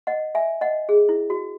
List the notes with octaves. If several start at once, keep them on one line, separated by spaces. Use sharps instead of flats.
D#5 F#5
E5 G#5
D#5 F#5
G#4
E4
F#4